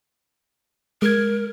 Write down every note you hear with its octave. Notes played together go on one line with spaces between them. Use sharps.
G#3 A#4 G#6